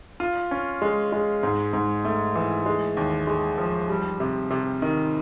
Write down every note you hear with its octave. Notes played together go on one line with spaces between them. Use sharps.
F4
C#4
G#3
G#3
G#2
G#2
A3
E3
G#3
D#2
G#3
F3
G3
C3
C3
D#3